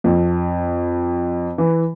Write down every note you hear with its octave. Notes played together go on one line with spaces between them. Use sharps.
F2
E3